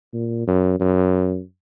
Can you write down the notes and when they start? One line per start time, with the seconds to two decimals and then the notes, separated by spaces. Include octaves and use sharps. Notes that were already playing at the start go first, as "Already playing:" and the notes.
0.14 A#2
0.47 F#2
0.80 F#2